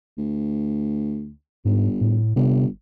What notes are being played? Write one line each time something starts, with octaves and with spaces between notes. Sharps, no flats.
D2
G1 G#2
A2
G1 C3